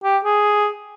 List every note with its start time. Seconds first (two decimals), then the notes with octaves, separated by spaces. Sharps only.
0.04 G4
0.25 G#4